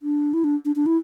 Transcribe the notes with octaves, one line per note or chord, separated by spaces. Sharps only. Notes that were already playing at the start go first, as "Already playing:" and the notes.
D4
E4
D4
D4
D4
E4